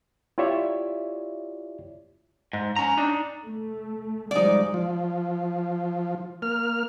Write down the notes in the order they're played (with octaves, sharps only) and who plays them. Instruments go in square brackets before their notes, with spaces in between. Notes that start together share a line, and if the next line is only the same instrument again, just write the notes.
[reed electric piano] E4 F4 G4 C#5 D5 E5
[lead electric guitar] G#2
C#4 A#5
D4 D#4
[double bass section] A3
[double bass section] F3 G3 G#3 [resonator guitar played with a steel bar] D#4 D5
[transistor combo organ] F3
A#3 F6